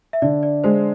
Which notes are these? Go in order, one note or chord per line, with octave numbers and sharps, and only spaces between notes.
E5
D3 D5
D5
G#3 C5